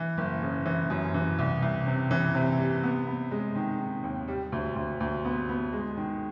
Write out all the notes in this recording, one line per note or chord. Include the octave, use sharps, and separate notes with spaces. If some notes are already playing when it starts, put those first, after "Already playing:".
Already playing: E3
F#1
C#3
E3
F#2
E3
C2
C2
C3
E3
C3
G3
B3
B3
G#3
D#3
D#3
D#2
G3
D2
D2
D2
B3
B3
G#3
D#3